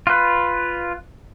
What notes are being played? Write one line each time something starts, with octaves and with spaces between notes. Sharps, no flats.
F4 B4